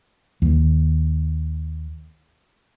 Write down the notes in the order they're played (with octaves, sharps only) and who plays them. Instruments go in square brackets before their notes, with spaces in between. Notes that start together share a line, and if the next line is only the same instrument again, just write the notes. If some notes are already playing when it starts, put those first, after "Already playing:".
[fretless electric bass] D#2 D#3